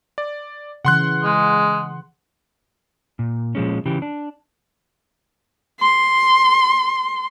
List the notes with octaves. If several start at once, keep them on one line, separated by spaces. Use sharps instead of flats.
D5
C#3 E3 F#5 C6 F#6
G#3
A#2
A#2 F3 G#3 C#4
C#3 E3 G4
D4
C6